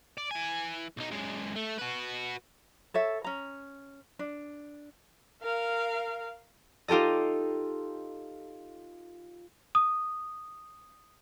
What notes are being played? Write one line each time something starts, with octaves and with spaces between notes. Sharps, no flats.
D5
E3 G#5
B1 D#4
F#2 G#3
A3
F#4 B4
A4 C#5 E5
C#4 A#5
D4
A#4 F5
D#4 F4 G4 A4 D#5
D#6